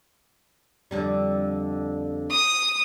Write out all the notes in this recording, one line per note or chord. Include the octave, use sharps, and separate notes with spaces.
F2 D3 G3
D#6